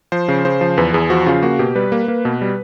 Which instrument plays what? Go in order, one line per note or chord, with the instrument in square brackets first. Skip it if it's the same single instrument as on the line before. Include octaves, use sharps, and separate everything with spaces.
[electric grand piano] F3 C5
C#3
C#3 C5
F3
E2 B4
E2 G#4
F3 F#4
C#3 F4
A#3 F#4
B2 G4
G3 B4
A#3
A#3
B2
G3